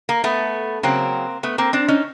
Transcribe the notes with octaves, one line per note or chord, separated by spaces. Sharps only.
A#3
A3 B3
C#3 F#3 A#3 C4
A3 B3
A#3 C4
C4 D4
C#4 D#4